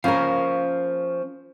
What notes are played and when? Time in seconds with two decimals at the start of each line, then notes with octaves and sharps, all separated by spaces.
0.04 F3 A#3 C#4 A#4 F5